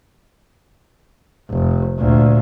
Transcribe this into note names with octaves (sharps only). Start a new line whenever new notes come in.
F1
D2 A#2